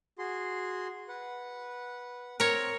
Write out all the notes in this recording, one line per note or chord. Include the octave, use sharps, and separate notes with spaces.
F#4 G#4 C6
B4 F#5
C4 A#4 C#5